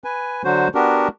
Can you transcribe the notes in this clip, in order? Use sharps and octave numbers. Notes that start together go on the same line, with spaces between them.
B4 G#5
D3 F#3 F#4 C5
B3 D4 F#4 G4 A#4